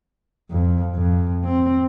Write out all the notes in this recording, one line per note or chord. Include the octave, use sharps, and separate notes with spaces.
F2
F2
C4